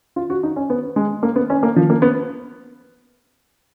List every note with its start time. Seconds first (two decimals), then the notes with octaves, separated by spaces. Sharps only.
0.16 F4
0.30 F#4
0.43 D#4
0.56 C#4
0.70 B3
0.96 G#3
1.23 A#3
1.36 B3
1.50 C#4
1.63 A#3
1.76 F3
1.90 A#3
2.02 B3